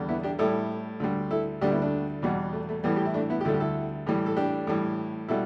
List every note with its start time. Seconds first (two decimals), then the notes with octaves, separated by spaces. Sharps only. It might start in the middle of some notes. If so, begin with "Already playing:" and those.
Already playing: E2 D3 G3
0.08 B3 E4
0.23 D4 G4
0.39 A2 G3 E4 A4
1.00 D2 D3 G3
1.31 E4 A4
1.61 D2 D3 G3 D4 G4
1.71 B3 E4
1.82 A3 D4
2.22 E2 B2 G3
2.53 A3
2.69 A3
2.84 A2 E3 G3 B3
2.96 G4
3.05 E4
3.14 A3 D4
3.30 B3 E4
3.41 G4
3.45 D2 D3 G3 E4 A4
3.54 G4
3.60 E4 A4
4.07 A2 E3 G3
4.26 A4
4.37 D4 G4
4.67 A2 E3 G3
5.28 B2 G3 E4 A4